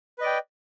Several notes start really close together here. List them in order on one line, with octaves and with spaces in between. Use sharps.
B4 D#5 D5 G5